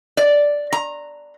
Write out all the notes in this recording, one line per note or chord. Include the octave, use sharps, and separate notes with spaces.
D5
A#5